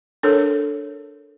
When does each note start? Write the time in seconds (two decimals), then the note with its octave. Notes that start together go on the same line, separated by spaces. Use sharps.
0.23 D4 A4 A#4 C#5